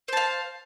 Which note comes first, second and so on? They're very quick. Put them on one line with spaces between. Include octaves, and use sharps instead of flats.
C5 A5 F5